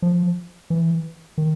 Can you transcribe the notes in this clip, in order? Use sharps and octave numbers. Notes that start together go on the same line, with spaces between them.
F3
E3
D#3